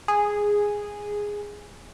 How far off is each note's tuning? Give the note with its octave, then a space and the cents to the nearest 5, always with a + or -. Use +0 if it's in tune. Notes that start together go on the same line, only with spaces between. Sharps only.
G#4 -5